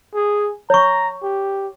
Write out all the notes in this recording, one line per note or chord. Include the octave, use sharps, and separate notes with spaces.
G#4
C#5 A#5 C#6
G4